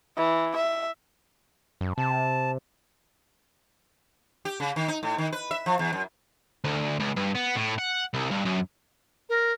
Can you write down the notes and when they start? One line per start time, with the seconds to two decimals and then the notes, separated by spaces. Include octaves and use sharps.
0.17 E3
0.56 E5
1.81 F#2
1.98 C3 A5
4.45 G4
4.60 C#3
4.76 D#3
4.88 D#4
5.03 A2
5.18 D#3
5.32 B4
5.51 E5
5.66 F3
5.79 E2
5.93 F#2
6.64 D2
7.00 C#2
7.16 G2
7.35 B3
7.56 A2
7.78 F#5
8.14 C2
8.31 G2
8.45 F#2
9.29 A#4